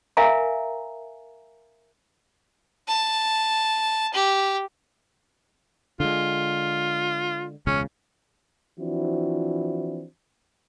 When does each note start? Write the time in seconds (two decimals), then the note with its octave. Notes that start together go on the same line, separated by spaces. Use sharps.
0.17 A#4 E5 F5 G#5 A#5
2.88 A5
4.14 G4
6.00 D3 G#3 F4
7.67 E1 C#2 C#3 C#4
8.80 E3 F3 C4 D4 E4 F#4